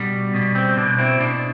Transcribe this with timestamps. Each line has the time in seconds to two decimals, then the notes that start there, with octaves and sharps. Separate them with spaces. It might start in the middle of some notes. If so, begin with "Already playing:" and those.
Already playing: B2 G3 D4 F#4
0.34 B2
0.55 C4
0.77 B2 D4
0.98 C4 E4
1.20 B2 D4